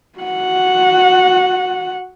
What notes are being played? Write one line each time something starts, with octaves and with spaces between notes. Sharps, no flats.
F#4 F#5